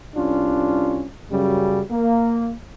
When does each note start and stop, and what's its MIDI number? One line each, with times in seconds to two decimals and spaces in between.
0.15 1.05 36
0.15 1.05 61
0.15 1.05 62
0.15 1.05 65
1.31 1.82 42
1.31 1.82 49
1.31 1.82 54
1.31 1.82 55
1.91 2.53 58